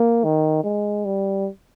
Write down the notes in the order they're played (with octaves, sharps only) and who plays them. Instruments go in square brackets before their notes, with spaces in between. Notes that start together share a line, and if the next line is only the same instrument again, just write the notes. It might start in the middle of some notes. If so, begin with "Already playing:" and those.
Already playing: [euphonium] A#3
D#3
G#3
G3